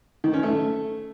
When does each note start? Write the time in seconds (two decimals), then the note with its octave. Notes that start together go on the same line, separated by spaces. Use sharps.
0.24 D#3
0.34 C#4
0.43 A3